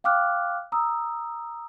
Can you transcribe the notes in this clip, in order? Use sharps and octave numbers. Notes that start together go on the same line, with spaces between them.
F5 G5 D6 F6 F#6
A#5 D#6 E6